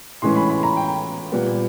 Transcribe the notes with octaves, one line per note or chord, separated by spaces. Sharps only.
A2 E3 G#3 C#4 C6
B5
B5
A#5
G5
A#2 G3 B3